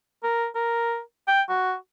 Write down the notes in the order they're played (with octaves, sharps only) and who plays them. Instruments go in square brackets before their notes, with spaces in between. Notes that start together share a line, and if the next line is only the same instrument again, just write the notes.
[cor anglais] A#4
A#4
G5
F#4